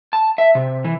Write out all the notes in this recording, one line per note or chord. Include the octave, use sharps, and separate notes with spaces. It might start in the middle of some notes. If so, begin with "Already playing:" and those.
A5
E5
C3
E3